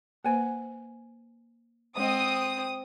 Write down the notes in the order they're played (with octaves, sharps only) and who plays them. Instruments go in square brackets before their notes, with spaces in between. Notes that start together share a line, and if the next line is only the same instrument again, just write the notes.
[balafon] A#3 B4 C5 [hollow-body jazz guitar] F#5 G#5
[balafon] G#3 D#5 [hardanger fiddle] C4 [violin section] D#6